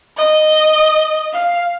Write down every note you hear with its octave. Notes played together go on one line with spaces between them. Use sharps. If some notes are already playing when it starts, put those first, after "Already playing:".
D#5
F5